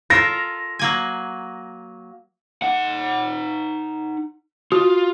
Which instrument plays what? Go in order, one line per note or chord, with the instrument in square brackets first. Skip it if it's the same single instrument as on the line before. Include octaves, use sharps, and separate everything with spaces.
[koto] F4 A4 A#4 [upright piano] A#6
[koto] F#3 A#3 G#5
[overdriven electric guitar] D#4 F#5
[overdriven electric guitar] F4 [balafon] F#4